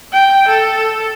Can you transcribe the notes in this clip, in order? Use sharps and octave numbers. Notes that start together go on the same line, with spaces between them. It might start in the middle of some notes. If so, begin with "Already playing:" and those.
G5
A4